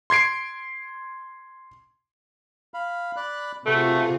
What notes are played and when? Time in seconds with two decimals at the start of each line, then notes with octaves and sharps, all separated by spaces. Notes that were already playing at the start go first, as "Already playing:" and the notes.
0.10 C6 G#6 C7 D7
2.74 F5 B5
3.16 D5 B5 F#6
3.66 C3 A3 F4 F#4 G#4 A4 B4